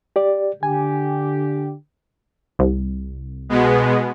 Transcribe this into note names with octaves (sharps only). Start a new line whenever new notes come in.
G4 D5
D3 G4 G#5
C2
B2 G#3 B3